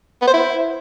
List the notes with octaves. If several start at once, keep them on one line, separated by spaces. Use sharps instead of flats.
B3
C5
E4